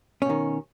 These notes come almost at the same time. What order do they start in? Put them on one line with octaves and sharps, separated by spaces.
C#4 B2 D#3